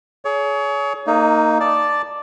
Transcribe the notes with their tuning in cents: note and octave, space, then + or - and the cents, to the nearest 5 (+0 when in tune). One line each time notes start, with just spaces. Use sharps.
G#4 +30 C#5 +30
A#3 -20 D#4 +0
D5 +0 A5 +0